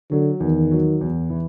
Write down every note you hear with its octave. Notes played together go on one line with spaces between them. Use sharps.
D3 F#3
E2 D#3
F#3
E2
E3